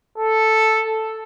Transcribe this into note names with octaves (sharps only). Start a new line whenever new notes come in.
A4